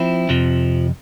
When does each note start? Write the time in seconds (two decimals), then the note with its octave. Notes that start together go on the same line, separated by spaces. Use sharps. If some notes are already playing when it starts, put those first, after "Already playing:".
Already playing: F3 C4 E4
0.29 F2 C3 F3